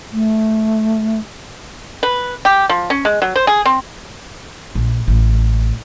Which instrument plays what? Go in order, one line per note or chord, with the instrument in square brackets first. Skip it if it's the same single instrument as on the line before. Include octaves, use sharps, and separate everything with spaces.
[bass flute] A3
[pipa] B4
G4
F3
C#4
G#3
F#3
C5
G#4
C4
[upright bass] A#1
A1